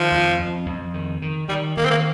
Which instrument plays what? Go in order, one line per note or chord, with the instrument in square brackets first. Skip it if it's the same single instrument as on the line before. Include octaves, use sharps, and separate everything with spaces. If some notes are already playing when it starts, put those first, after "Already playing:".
Already playing: [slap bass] D#3 [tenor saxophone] F3
[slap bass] F2
F2
F2
D#3
D#3
[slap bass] D#3 [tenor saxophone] G3
[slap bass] D#3 [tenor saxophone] A#3
[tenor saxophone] C4
A#3